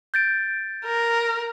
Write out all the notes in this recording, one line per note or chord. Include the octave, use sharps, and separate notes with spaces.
G6 A6 D7
A#4